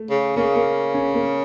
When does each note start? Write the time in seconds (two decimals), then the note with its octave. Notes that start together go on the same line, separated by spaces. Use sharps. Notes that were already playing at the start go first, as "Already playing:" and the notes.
Already playing: A3
0.10 C#3
0.36 C#3 A#3
0.55 A#3
0.94 C#4
1.14 A#3